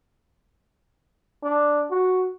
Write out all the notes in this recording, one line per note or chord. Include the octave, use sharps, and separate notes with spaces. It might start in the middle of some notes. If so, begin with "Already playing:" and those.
D4
F#4